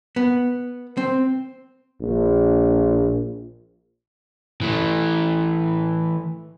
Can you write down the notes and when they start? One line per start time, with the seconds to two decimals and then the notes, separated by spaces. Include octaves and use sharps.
0.16 B3
0.97 C4
2.01 A#1
4.62 E3 A3